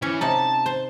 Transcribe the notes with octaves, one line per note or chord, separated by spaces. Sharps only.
E3 C#4
C3 D#4 A5 B5
C5